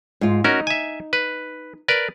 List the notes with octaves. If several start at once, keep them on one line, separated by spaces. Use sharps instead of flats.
G#2 F4
C#4 D#4 F#4 A#4
E5 G#5
B4
A#4 B4 D5